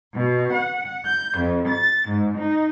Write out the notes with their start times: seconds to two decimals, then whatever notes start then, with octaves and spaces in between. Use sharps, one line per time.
0.14 B2
0.52 F#5
1.05 G6
1.38 F2
1.69 A6
2.08 G#2
2.37 D#4